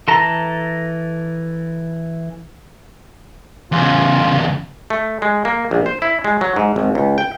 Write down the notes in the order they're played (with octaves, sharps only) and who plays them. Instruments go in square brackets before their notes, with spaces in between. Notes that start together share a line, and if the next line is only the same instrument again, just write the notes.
[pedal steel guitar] E3 A4 A5 A#5
[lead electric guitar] E2 C#3 [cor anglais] F4
[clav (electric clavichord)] A3
G#3
A#3
A#1
C5
E4
G#3
F#3
G#2
G#1
C#2
G5